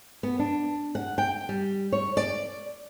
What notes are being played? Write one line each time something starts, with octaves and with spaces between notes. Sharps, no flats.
B3
D4
F#5
G5
G3
C#5
D5